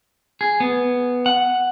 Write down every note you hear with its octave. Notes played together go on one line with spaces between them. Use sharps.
G#4
B3
F#5